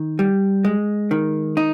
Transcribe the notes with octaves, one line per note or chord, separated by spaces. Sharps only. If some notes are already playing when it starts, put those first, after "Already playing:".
Already playing: D#3
G3
G#3
D#3
D#4